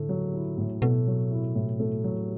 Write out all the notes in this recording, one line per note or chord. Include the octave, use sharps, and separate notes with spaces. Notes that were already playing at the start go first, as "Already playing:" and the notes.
Already playing: A2 D3 A3
F#3
E4
A2
B2 A3
F#3
E4
A2
A3
F#3